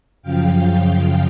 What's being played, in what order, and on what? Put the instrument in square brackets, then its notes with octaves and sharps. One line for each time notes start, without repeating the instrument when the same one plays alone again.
[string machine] F#2 C#3 F3 F5 G5